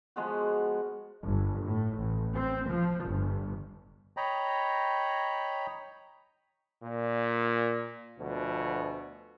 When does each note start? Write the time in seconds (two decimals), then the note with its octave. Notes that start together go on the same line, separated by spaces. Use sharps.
0.16 F3 G#3 B3 F#4
1.23 G1
1.67 A2
1.97 A1
2.35 C4
2.69 F3
3.05 G1
4.17 C#5 D#5 G5 A#5 B5
6.84 A#2
8.20 D2 B2 F3